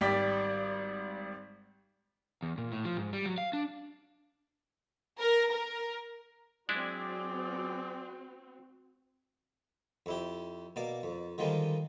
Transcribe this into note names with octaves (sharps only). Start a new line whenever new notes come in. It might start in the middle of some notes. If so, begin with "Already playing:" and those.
G#1 G3 G4 D5 G5 B6
E2
A#2
A2
F3
G#2
G3
F#3
F5
D4
A#4
A#4
F#3 G#3 C4 D4 E4 F#4 G#4 D5
F2 E4 G4
B2 A#3 D5 D6
F2
D3 D#3 F3 G3 G#3 A#3